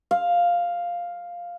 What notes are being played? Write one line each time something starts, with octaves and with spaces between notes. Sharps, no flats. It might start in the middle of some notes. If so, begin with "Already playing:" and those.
F5